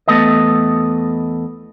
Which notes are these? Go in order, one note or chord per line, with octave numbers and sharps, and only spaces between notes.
E2 A3 B3 A4 D#5